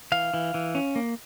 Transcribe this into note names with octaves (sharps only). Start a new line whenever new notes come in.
E3 F5
E3
E3
C#4
A#3